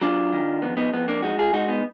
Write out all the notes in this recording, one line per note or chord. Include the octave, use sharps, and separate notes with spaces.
F#3 D4 F4
D#3
F2 B3
B3 D#4
F2 B3
A#3 D4
G#3 D#4 F#4
F4 G#4
G#3 D#4 F#4
B3 D#4